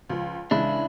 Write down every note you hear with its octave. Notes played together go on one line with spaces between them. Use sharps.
C#2 F3
C#3 E3 G#3 D4 E4